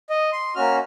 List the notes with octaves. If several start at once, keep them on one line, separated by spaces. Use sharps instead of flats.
D#5
C6
A#3 C#4 F#4 F6